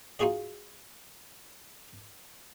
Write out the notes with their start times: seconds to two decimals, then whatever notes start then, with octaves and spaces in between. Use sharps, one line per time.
0.19 D#4 F4 F#4 G#4 D#5